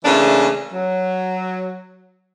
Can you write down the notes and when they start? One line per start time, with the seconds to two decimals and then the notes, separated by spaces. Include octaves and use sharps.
0.05 C#3 E3 A3 A#3 D4
0.73 F#3